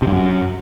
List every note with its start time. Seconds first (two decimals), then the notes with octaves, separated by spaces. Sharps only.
0.02 C3
0.07 G2
0.12 F#2